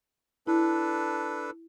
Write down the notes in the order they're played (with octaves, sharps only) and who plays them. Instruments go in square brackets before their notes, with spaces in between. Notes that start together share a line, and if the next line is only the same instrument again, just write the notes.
[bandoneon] D4 A4 B4 [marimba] E4